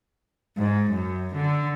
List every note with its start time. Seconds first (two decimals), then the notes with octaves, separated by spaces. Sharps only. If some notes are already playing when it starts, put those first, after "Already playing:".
0.57 G#2
0.91 F#2
1.35 D3